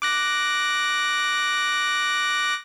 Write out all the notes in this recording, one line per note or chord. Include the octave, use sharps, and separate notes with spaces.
D6 F#6 A#6